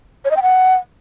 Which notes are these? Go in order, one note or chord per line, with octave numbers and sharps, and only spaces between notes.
C#5
D#5
G5
F#5